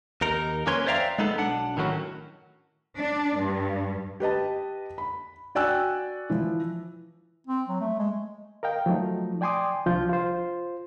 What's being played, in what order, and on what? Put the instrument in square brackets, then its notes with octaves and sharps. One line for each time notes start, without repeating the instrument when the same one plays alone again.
[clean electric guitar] D#2 D#4 A#4
F2 A#3 C#4 B4 C#5 C6
C5 D5 E5 F5 G5 A#5
G#3 B3 D#4 A4
B1 D4 F#5
A2 D#3 F#3 C#4 F#4
[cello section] D4
G2
[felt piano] G4 B4 D#5 A5
B5
F#4 D5 G5 G#5 E6 F#6
E3 F3
[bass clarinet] C4
F#3
A3
G#3
[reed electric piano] A#4 D#5 F5 G5
F3 F#3 A3 D#4
D5 G5 G#5 C6 D6 D#6
C2 F3 D4 F4 G6
F4 C5